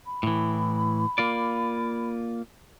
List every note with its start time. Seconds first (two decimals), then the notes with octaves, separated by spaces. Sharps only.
0.05 B5
0.23 A2 E3
1.18 A#3 F4 D5